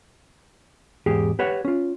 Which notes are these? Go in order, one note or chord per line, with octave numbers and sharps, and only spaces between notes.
E2 G#2 G4 G#4
G4 B4 C#5 F#5
C#4 F4